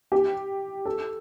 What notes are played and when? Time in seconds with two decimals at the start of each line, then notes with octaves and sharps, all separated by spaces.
0.12 G4
0.86 A4